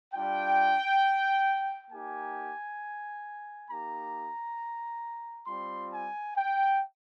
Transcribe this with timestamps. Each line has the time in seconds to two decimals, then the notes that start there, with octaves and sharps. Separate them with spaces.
0.13 G3 D4 F4 G5
1.91 A#3 D#4 G4 G#5
3.69 A#3 D#4 G4 A#5
5.47 G3 C4 F4 C6
5.92 G#5
6.36 G5